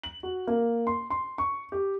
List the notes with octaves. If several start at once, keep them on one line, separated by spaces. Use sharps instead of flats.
F#7
F#4
A#3
C6
C6
C#6
G4